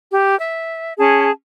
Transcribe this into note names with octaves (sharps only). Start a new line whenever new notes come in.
G4
E5
C#4 G#4 A5